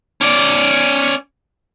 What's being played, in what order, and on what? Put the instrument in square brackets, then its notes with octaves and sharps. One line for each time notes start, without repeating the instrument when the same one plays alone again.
[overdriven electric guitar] C#4 D5